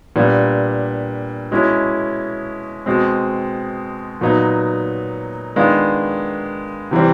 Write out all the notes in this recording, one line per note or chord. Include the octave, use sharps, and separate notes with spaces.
A#2 G3 B3 D4
B2 G#3 C#4 E4
B2 G#3 C4
A#2 F#3 B3 D#4
D#3 G#3 B3 D4 F4
C3 E3 G3 C4